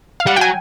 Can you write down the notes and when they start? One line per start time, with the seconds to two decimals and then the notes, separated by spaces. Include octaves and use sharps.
0.20 F5
0.26 G3 F#5
0.36 F#3 G5 G#5